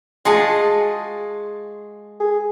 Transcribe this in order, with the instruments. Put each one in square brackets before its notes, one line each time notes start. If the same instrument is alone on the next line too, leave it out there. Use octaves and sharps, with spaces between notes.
[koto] G#3 G#4 [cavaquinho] F4 F#4 A5
[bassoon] G#4